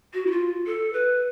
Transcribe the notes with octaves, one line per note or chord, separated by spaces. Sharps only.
F#4
E4
F4
A4
B4